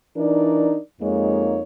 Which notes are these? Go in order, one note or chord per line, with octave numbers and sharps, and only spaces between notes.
E3 D4 D#4 A#4 D5
F2 G#3 A#3 D#4 C#5